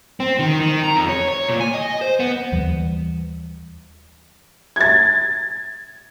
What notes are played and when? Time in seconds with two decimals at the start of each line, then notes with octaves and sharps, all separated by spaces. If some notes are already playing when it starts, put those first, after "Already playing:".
0.20 C4
0.39 D#3
0.60 D#3
0.83 A#5
0.96 F2
1.09 C#5
1.29 C#5
1.49 A#2
1.61 G#5
1.74 D#5
2.01 C5
2.20 B3
2.52 D#2 E3 G3
4.76 G#6 A6